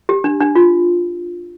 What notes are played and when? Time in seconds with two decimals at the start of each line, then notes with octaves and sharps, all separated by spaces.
0.09 G4
0.24 D4
0.40 D4
0.55 F4